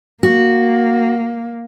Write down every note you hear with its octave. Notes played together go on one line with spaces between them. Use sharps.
A#3 F#4